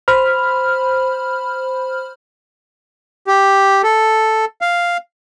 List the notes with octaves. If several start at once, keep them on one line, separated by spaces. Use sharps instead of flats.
C5 B5 F6
G4
A4
F5